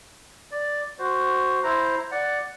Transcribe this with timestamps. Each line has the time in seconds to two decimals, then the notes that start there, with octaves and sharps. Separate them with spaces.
0.51 D5
0.99 F#4 C5
1.63 E4 C5 A#5
2.11 D5 F#5